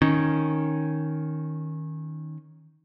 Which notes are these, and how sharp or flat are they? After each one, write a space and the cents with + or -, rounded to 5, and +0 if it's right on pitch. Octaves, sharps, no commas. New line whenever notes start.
D#3 +0 C#4 +0